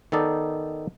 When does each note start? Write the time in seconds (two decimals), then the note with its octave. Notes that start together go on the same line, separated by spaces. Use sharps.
0.12 D#3 B3 D#4 A4 D5